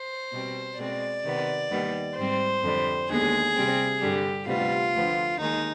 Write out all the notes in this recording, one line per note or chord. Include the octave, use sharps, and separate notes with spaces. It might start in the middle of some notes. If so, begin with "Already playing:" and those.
Already playing: C5
B2 G3 C4
B2 G#3 C4 D5
C3 D#3 B3
D#2 D#3 G3 B3
G#2 G3 C4 C5
F2 D3 G3
D#2 D3 G#3 B3 G#4
C3 G3 C4
G2 D3 G3 G4
D2 C3 G3 B3 F4
D2 D3 F3 B3
D#2 D#3 G#3 D#4